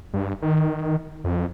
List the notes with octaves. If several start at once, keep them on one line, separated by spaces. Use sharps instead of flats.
G2
D#3
F2